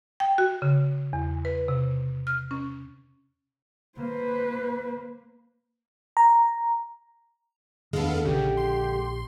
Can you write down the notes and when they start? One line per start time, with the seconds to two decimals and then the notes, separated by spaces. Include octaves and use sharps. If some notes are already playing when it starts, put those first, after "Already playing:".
0.20 G5
0.38 F#4
0.62 C#3
1.13 E2
1.45 B4
1.68 C3
2.27 F6
2.51 C#4
3.99 A#3 B4 C5
6.17 A#5
7.93 E2 D3 D#3 G#3 B3 A4 F5
8.25 A#1 C#3 G4
8.57 C6